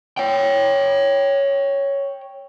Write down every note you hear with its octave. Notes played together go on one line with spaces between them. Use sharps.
C#5 G5